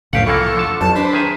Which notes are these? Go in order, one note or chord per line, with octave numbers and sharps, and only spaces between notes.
G1 C2 F2 A2 C#3 G4 F5 F#5
A2 E3 F3 A#3 A4 C#6
D3 A5
A1 F2 F#3 A5
D4 B4 C5
D#3 G#4 E5